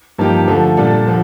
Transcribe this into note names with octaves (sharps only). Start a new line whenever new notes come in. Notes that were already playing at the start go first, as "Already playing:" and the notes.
G2 F3 A#3 D#4 G4
D3 F3 A3
A#2 G3 D4 A4
D3 F3